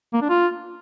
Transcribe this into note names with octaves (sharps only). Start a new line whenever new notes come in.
A#3
D4
F4